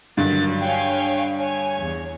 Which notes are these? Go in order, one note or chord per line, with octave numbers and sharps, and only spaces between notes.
G2 D3 D#3 F#3 A6
C#5 F5 G5 G#5
C#5 G#5
E2